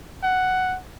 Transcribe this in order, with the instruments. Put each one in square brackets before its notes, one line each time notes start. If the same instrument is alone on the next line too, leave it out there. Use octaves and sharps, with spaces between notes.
[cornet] F#5